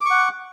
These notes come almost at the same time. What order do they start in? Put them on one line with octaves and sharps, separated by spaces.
D6 C#6 F#5